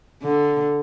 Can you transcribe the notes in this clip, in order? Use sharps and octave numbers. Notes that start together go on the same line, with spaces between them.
D3